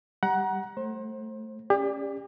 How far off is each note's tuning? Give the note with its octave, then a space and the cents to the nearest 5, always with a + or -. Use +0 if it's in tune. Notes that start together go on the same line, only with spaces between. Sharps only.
G3 +0 F#5 +15 A#5 +30
A3 +0 C5 +30
C#4 +0 G4 +40 D5 +0